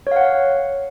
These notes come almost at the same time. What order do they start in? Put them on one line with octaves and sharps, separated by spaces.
C#5 F5 F#5